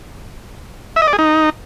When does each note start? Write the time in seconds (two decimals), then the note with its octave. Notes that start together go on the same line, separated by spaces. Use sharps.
0.96 E5
1.02 D#5
1.07 D5
1.13 G#4
1.19 D#4